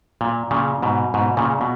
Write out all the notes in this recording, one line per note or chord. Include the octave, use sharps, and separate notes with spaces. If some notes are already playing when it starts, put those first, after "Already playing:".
A#2
A#2 C#3
G#2 B2
G#2 B2
A#2 C#3
B2